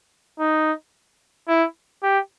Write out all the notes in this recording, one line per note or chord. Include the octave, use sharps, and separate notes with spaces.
D#4
E4
G4